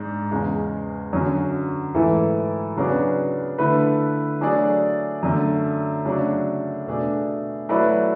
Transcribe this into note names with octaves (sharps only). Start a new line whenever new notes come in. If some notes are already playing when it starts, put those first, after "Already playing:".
Already playing: G#2 G#3 D4
E2 C#3 G#3
F#2 D3 F#3 C#4
G#2 E3 A3 E4 A4
C#3 F#3 B3 D4 G#4
D3 A3 E4 B4
F#3 A3 D4 G#4 D5
F#2 D3 A3
C#3 F#3 A3 D4 A4
B2 A3 D4 G#4
F#3 A3 E4 B4 D5